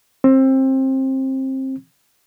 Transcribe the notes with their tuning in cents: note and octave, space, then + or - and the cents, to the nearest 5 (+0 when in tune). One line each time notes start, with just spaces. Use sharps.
C4 +25